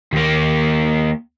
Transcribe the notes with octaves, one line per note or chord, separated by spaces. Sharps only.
D#2 A#3